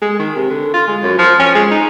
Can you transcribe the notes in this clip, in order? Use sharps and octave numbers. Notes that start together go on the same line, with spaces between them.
G#3
D#3
C3
D3
F4
G#3
F#2
F3
C#4
G#3
D#4